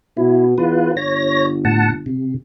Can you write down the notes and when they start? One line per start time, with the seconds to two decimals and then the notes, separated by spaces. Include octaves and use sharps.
0.17 B2 E4
0.58 E2 F4 B4
0.97 G1 C#5 A#6
1.65 A2 F#5 A5
2.06 C3